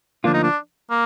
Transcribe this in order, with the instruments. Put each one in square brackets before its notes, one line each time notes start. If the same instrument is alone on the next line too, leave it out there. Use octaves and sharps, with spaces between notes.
[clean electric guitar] D2 D3 F3 A#3 F4 [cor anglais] D4
[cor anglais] D#4
D4
A#3